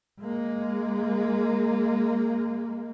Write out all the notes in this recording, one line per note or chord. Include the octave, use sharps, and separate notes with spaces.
G#3 A#3